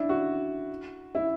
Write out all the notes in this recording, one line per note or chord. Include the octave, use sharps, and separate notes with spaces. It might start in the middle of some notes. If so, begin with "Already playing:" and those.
Already playing: D4 E4
F#4
E4